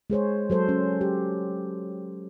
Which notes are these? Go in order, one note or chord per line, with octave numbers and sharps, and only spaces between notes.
G#3 G#4 C5 C#5
F#3 A4 C5
C#4
G4